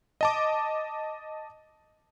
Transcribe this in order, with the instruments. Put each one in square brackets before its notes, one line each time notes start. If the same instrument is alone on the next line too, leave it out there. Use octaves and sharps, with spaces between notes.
[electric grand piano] D#5 A5 D6